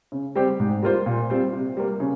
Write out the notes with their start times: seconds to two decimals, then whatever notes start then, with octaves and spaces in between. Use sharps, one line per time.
0.12 C#3
0.35 G3 C4 G4 C5
0.60 G#2
0.83 G3 A#3 F4 C5
1.06 A#2
1.30 G3 C4 F4 C5
1.53 C3
1.77 G3 A#3
2.00 C#3